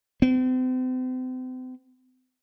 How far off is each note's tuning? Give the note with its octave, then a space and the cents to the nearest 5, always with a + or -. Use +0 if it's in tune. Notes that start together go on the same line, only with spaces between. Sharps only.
C4 -40